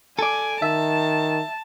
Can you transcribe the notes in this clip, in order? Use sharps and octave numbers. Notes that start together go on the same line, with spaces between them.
A4 D5 G#5
D#3 E5 A5